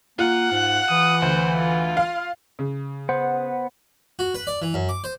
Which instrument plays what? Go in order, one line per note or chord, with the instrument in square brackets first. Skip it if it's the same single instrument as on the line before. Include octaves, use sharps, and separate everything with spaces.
[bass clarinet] A#3 [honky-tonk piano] F4 [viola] F#5
[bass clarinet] G#2 [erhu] F#6
[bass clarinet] E3 [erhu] D#6
[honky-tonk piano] D2 [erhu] C5
[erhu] F4
[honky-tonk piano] F5
[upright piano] C#3
[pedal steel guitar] B3 F#5 [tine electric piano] C5
[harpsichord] F#4
B4
D5
E3
F#2
D6
C5